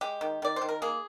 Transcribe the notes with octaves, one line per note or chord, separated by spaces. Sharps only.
G#3 G4
D#3
D#3 D5
C5
D#3
A#4
A#3 G#4